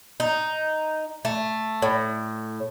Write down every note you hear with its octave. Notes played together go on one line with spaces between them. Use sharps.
D#4
A3
A2